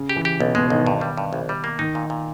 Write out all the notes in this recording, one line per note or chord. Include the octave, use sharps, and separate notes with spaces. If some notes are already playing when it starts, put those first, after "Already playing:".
Already playing: C#3
G4
E3
G4
B1 B2
B2 G#3
B1 D#3
G2 D#3
G3
G2
A#1
G3
A#3
D#3 D#4
A#2
A#2